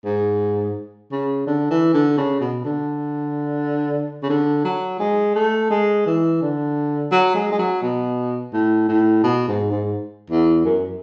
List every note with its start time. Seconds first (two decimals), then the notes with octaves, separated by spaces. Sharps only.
0.05 G#2
1.12 C#3
1.47 D3
1.71 E3
1.94 D3
2.17 C#3
2.41 B2
2.65 D3
4.23 C#3
4.29 D3
4.65 F#3
5.00 G#3
5.36 A3
5.70 G#3
6.06 E3
6.42 D3
7.12 F#3
7.35 G#3
7.52 G#3
7.59 F#3
7.82 B2
8.53 A2
8.88 A2
9.23 B2
9.48 G#2
9.71 G#2
10.30 E2
10.65 F#2